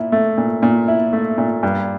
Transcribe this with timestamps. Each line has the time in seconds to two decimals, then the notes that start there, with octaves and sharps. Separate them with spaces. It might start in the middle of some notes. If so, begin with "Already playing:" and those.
Already playing: A#2 E4
0.12 A3
0.38 A#2
0.63 A#2
0.88 E4
1.13 A3
1.38 A#2
1.63 G2